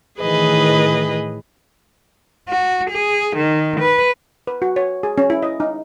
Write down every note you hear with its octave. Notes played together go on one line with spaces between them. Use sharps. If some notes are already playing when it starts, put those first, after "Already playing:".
A2 D#3 E3 G#4 B4 D#5
F#4
G#4
D#3
B4
B4
F#4
C#5
G#4
C#4
E4
D#5
D#4